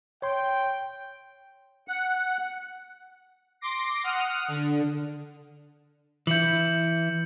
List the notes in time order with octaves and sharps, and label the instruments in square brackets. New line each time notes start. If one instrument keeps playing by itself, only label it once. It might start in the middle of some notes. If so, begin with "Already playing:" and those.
[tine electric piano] C#5 C6 [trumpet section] G5
[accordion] F#5
[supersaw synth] C6 D6 A#6 C7
F#5 D#6 F6
D3
[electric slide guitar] E3 E4 [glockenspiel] G6 C#7 F#7